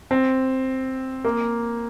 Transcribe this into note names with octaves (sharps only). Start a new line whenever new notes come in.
C4
A#3